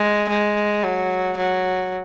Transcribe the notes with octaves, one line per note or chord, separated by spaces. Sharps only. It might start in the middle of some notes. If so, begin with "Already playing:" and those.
Already playing: G#3
G#3
F#3
F#3